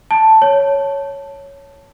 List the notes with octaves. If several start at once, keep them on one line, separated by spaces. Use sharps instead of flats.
A5
C#5